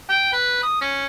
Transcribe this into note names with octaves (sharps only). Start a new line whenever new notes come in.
G5
B4
D#6
C#4